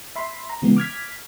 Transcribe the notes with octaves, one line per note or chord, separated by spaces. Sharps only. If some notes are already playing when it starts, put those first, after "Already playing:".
E5 B5 C6
A#5
C#3 E3 G#3 B3
D6 F6 G#6 B6